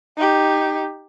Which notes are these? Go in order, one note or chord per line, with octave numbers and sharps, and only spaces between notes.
D#4 G4